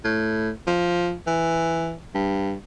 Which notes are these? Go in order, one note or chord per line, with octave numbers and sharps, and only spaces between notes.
A2
F3
E3
G2